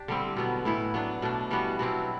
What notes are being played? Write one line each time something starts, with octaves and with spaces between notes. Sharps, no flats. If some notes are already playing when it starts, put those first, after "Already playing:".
Already playing: D4 G4
D3 G3 C4 E4
B2 F#3 B3
A2 E3 B3 E4
F#3 B3 D4
B2 A3 D4
E3 G3 B3 F#4
B2 F#3 C4 E4